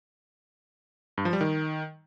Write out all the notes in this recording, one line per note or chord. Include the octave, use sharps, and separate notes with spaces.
G2
F3
G3
D#3